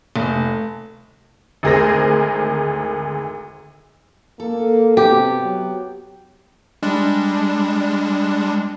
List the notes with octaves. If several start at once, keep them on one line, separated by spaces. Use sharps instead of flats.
F1
G#1 D2 G#4 A#4 C5 A#6
A#3 A4
C3 B3 G4
F#3
G3 G#3 D4